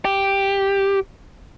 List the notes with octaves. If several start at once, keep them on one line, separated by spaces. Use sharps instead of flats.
G4